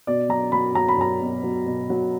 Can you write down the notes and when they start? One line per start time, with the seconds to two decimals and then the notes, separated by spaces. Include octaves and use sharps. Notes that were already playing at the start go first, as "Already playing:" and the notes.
0.07 B2 D5
0.29 F#3 A#5
0.52 F#3 B5
0.75 F#3 A#5
0.89 B5
0.98 F#3 A#5
1.21 B2
1.44 F#3
1.66 B2
1.90 F#3